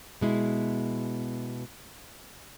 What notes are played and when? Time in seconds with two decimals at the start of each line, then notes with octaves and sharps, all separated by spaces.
0.21 B2 G#3 E4